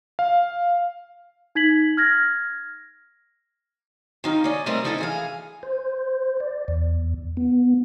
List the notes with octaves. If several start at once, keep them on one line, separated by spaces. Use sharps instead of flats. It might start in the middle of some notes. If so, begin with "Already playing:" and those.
F5
D#4 G#6 B6 F#7
F6 G#6 A#6
D#3 D#4 F4
C#4 D5 D#5
G3 A3 C4 A#4 D#5
F3 D#4 E4 A4 D#5
E3 G#4 F5
C5
D5
E2
B3